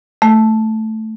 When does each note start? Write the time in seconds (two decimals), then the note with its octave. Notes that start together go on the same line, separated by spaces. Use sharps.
0.22 A3